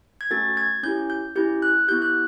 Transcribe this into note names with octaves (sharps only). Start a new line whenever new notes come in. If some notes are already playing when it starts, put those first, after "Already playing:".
G#6
A3 C#4 F#4 A4 A6
G#6
C#4 E4 G4 G6
G6
C#4 E4 G4 G6
F#6
B3 E4 G4 G6
F#6